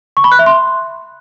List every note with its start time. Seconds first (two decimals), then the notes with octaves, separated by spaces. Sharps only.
0.17 C#6
0.24 B5
0.32 F#6
0.39 E5
0.46 C6